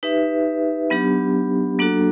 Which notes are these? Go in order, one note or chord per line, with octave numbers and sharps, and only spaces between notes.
D#4 G4 B4 E5
F#3 B3 D4 G4
F#3 A#3 D4 F#4 A4